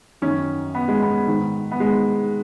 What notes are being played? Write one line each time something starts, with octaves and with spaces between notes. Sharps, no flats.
F#2 D#3 C#4
B3
G#3
B3
G#2 D#3
B3
G#3